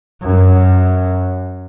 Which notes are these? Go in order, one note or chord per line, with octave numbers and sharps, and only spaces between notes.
F#2